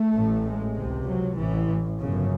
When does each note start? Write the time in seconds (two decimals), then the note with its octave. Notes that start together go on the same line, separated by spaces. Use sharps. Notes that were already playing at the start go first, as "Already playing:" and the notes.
Already playing: A3
0.15 A1 A2
0.45 G#3
0.76 C#2 C3
1.07 F#3
1.38 A1 A2 E3
1.99 G1 F#2 C#3